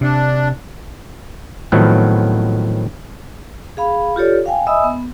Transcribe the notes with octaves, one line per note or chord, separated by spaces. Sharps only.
C3 D4
A2 D#3 F3 F#3 B3 C4
G#4 F5 B5
F4 G4 A4 C#5 D5
F5 G5 G#5
D#5 E5 G#5 B5 D#6 E6
B3